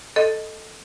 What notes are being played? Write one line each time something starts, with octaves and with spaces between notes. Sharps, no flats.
A4 D#5